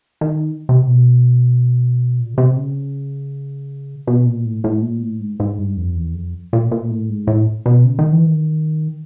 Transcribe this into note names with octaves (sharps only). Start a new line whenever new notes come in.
D#3
C3
B2
A#2
C#3
C3
C#3
B2
A#2
A2
A2
A#2
A2
G#2
G#2
G2
F2
E2
F2
A#2
A#2
A2
G#2
A2
B2
C#3
D#3
E3
D#3